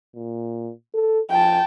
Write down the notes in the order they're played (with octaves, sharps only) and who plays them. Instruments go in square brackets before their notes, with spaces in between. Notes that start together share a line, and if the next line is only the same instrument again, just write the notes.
[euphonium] A#2
A4
[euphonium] F3 [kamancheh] G5 A5